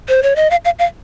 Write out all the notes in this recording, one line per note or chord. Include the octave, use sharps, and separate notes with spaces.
C5
C#5
D#5
F5
F5
F5